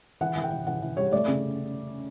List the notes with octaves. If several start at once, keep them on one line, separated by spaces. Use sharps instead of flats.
E3 F#5
E3
G5
E3
E3 F#5
E3
G3 C#5
A3 D5
C#3